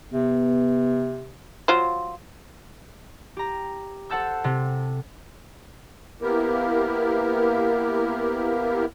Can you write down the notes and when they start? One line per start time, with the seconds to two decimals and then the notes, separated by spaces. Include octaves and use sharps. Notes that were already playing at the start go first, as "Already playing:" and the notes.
0.13 C3 B3
1.68 F#3 F4 C5
3.37 G4 A#5
4.10 A4 C5 F#5 A5 E6 G6
4.44 C3
6.21 A#3 B3 E4 G4 A#4